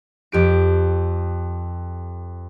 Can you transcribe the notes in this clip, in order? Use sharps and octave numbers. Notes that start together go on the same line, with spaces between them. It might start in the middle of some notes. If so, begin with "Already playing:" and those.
F2 G4 D7